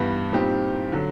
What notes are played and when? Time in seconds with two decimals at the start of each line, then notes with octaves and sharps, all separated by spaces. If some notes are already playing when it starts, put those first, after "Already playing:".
Already playing: G2 E3 G3 B3
0.32 A#2 G3 C4 D#4 G4
0.92 D3 F#3